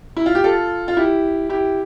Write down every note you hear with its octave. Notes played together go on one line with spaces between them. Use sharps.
E4
F4
G4
F4 A4
F4
E4 G4
E4 G4